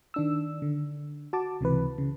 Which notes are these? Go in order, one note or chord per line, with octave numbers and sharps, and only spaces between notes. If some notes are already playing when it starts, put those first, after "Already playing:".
D#3 D4 E6
D3
F#4 A5 D6
C#2 C3 E3 B4
C#3